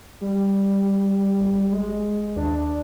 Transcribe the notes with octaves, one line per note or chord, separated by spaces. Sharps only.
G3
G#1
G#3
D#2 D4